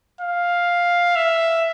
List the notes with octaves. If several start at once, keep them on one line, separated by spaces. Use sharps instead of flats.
F5
E5